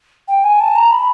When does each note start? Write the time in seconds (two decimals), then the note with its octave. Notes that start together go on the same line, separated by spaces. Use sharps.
0.28 G5
0.44 G#5
0.60 A5
0.76 A#5
0.91 B5